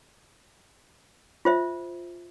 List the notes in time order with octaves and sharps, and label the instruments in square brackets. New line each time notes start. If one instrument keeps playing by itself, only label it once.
[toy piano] F4 C5 E5